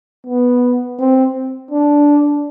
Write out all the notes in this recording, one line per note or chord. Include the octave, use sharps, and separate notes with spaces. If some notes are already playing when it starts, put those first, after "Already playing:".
B3
C4
D4